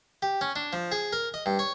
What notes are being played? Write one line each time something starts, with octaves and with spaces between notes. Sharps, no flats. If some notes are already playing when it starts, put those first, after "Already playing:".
G4
C#4
D4
F3
G#4
A#4
D#5
G2
C#5